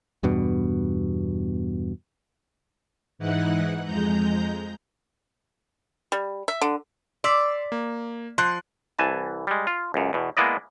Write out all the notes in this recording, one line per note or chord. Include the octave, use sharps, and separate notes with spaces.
E2 G2 B2
G#2 E3 D#4 E4 F#5 F#6
F2 G#3 A#5 G6
G3
E5
D3
D5 C6 E6 B6
A#3
F3 C6 F#6
C2 E3 G#5 A5
G3 G#3
F4
C#2 F#2
E2 B2
G#3 A#3 B3 E4 D5 D#5